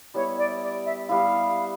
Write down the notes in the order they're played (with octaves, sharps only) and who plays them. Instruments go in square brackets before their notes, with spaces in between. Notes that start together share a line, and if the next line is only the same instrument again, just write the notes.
[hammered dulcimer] G3 B3 E4 [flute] C#5
[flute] D5
D5
E5
[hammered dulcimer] G3 B3 E4 [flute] F5